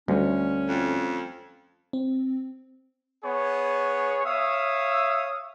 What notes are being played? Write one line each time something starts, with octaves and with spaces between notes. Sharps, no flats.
D2 G3 A3 C#4
F2
C4
B3 G#4 C#5
C#5 E5 F5 D#6